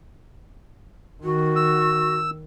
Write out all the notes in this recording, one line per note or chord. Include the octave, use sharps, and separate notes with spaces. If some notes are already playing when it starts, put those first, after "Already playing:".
D#3 F#4
E6